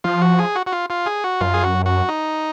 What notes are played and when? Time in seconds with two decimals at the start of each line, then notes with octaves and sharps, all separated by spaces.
0.04 F3 F4
0.22 F#4
0.39 G#4
0.55 F#4
0.67 F#4
0.72 F4
0.90 F4
1.06 G#4
1.24 F#4
1.41 F#2 F4
1.54 G#4
1.64 F#4
1.86 F#4
2.09 D#4